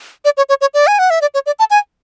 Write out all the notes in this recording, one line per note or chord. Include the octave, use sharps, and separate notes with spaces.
D5
C#5
C#5
C#5
D5
G#5
F#5
E5
D5
C#5
D5
A5
G#5